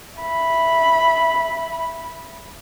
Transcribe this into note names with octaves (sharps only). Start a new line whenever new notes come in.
E5 B5